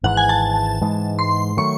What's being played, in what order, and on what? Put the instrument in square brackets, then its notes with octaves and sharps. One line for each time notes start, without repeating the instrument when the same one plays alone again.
[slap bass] G#1 G#2 E3 [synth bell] F#5
[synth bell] G#5
A5
[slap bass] G#2 E3 G#3
[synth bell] C6
[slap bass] D#3 F#3 A3 [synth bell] C#6